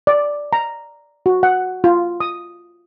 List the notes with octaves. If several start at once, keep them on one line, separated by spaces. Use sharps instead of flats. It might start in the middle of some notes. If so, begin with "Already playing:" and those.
D5
A#5
F#4
F#5
F4
D#6